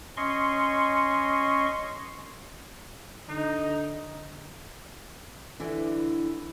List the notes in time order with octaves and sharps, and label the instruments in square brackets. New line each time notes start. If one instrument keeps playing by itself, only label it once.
[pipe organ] C#4 D#5 C6 C#6
[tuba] D3 [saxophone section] D#4
[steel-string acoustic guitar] D3 E3